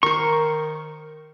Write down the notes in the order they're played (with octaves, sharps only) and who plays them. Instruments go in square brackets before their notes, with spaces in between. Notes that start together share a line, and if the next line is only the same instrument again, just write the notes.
[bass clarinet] D#3 [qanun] A#4 C5 [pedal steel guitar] C#6